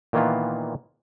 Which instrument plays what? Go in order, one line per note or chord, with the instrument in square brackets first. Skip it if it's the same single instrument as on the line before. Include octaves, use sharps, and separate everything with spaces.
[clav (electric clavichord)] A#2 D#3 E3 A#3 B3 F4